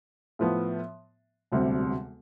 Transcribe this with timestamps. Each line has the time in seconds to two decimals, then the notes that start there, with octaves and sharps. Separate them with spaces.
0.39 A2 F3 B3
1.52 E1 D2 C3 G3 C4